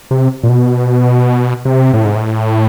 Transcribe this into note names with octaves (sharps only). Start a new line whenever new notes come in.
C3
A#2
B2
C3
A2
G#2
A2